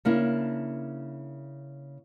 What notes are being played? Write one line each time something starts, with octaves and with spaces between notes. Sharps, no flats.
C#3 A#3 D4 E4